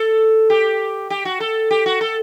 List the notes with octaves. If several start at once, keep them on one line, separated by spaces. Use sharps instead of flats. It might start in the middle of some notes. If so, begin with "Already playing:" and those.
Already playing: A4
G4
G4
F#4
A4
G4
F#4
A4